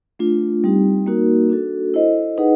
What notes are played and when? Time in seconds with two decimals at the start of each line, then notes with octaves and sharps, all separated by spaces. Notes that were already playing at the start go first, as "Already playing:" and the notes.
0.19 A3 D4 F4
0.64 G3 C4 D#4 G4
1.06 A#3 D#4 F#4 A#4
1.50 D4 F#4 A4
1.94 E4 A4 C5 D#5
2.38 D#4 G#4 B4 D#5 F#5